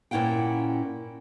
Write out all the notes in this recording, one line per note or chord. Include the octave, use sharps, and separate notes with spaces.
A#2 C#4 E4 F#5 G5